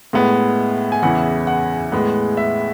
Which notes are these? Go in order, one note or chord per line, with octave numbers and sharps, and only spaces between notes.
A2 G#3 B3
G#5
E2 C#3 E3 B3 E4 F#5
F#5
A2 G#3 B3
E5